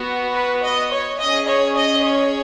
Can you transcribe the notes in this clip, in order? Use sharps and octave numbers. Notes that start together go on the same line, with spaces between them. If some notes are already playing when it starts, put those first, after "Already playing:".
Already playing: B3 F#4
B4
D#5
C#5
C#4 G#4 D#5
C#5
D#5
C#5